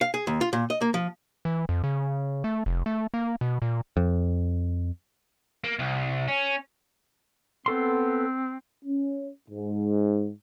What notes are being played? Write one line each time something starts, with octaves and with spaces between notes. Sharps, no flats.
F5
G#4
D#2
F4
A#2
D#5
A#3
F3
E3
F2
C#3
A3
F1
A3
A#3
B2
A#2
F2
A#3
C2
C#4
B3 C4 A4 C6
C#4
G#2